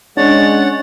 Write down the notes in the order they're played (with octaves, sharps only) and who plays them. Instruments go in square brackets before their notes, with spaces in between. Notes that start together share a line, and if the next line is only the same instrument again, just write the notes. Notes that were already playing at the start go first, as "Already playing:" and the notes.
[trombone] G#3 [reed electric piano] C#4 D4 [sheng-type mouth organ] C#5 F#5 [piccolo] A6